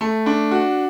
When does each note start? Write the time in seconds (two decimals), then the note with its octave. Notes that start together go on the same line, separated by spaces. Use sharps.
0.01 A3
0.26 D4
0.51 F#4